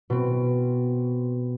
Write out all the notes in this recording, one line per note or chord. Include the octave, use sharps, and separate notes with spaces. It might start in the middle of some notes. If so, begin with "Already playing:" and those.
B2 C4